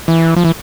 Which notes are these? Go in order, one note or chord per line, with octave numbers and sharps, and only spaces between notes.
E3
F3
E3